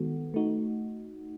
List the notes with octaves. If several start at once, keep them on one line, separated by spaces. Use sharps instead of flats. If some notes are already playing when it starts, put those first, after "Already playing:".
Already playing: D#3 G#3 B3 F#4 A4
A3 D#4 F#4